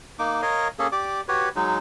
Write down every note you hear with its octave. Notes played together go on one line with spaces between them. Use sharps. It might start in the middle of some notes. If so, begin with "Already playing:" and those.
A#3 D#4 D6
A#4 C#5 D#5 F5
A#3 C#4 G#4 A4
G4 D5 D6
F#4 G4 B4 C#5
F#3 G#3 D#4